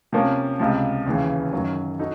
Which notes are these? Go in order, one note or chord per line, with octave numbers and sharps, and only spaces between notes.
C3 F3 A#3 C#4
C#2 C3 F3
D#2 C#3 E3
F#2 D#3 F#3
D#4 F#4 A4